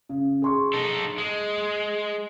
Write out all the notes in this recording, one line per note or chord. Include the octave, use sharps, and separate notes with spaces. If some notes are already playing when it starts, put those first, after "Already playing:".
C#3
G#4 C6 C#6
D#4 A4
G#3